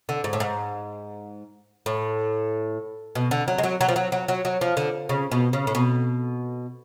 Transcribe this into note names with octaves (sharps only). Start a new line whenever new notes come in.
D3
G#2
A2
G#2
A2
B2
D3
F#3
G#3
F#3
F#3
F3
F#3
F#3
F#3
F#3
F3
D3
C#3
B2
C#3
A2
B2